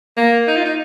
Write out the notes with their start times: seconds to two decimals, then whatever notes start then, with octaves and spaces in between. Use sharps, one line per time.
0.17 A#3
0.48 D#4
0.56 F4
0.65 D#4